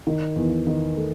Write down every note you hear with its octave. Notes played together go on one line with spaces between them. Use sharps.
D#3
E2
D#3
A3